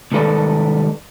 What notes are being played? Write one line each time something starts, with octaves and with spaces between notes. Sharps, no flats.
C2 G#2 D#3 A4 B4 D5